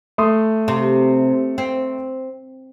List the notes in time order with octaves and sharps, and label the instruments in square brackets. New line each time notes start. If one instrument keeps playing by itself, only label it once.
[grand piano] A3 C6 D#6
[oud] C3
C4